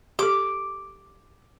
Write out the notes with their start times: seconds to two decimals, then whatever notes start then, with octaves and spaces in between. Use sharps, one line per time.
0.19 G4 A4 D6